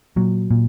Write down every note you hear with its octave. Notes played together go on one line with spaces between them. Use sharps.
A#2 F#3
A#2